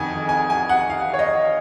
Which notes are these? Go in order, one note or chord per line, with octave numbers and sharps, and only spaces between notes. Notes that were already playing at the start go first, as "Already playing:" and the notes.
Already playing: F2 D#3 G#5
G#5
G#5
F#5
F5
C#5
D#5